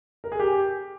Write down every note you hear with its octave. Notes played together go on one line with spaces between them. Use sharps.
A#4
G#4
G4